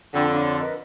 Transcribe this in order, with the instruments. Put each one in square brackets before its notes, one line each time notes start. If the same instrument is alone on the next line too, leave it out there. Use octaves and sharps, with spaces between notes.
[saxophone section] F2 D3 [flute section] D4 G5 A5
[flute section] D4 F4 C#5
A#4 B4 D#5